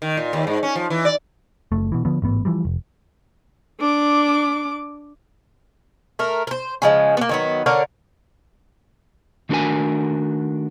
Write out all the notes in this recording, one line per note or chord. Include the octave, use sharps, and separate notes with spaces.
D#3
A#2
D#2
G#2
C#4
F3
E3
D5
F#1 A3
B2 E3
D3 F3 B3
A1 G#2 B3
E3 F3 G3
F1
D4 D6
A3 A#4
A#4 C5
C#3 F3 G#3
A#3 B3
D#3 F#3 B3
D3 A#4 C#5 F5
D#3 A3 D4 F#4 A#4 G#5